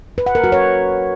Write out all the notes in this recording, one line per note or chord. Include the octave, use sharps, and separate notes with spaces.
B4
F#5
A#4
F#4
C#5